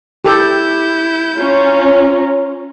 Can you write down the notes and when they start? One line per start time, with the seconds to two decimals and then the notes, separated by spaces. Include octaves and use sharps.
0.25 E4 G4 A4 G6
1.36 C#4 F4 C#5 A#5